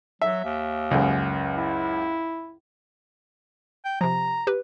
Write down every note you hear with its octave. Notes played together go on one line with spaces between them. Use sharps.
F#3 E5
D#2
C#2 F#2
E4
G5
C3 F3 A#5
G4 B4